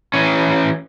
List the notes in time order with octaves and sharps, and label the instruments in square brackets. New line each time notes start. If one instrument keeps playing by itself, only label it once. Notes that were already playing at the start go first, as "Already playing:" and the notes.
[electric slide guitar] E3 C#4